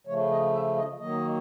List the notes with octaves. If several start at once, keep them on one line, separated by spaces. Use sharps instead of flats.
C#3 F3 A3 C#5
D#5
E5
D#5
D#3 F#3 A#3 D#5